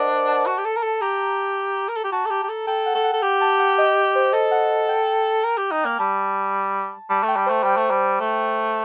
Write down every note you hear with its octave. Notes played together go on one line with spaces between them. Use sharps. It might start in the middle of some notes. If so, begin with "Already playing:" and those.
Already playing: D4 A#4 C5 D5 D#5 F#5
A5
F#4
G4
A4
A#4
A4
G4 A#5
A#4
A4
G4
F#4 A5
A4
G4
G4
A4
A4 G5
F#5
A4
F#5
A4
G4
A5
F#5
D#5
C5
A4 D#5
F#5
G5
A#4
G4
D#4
A#3
G3 A5
G3 A5
A3 G5
G3
A3 C5
G3 G5
A3
G3
A3